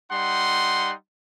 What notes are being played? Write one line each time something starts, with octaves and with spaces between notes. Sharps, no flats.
G3 D#4 F#5 C6